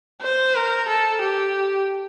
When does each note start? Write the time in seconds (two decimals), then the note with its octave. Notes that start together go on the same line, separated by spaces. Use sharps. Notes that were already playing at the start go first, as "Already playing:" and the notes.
0.22 C5
0.55 A#4
0.88 A4
1.21 G4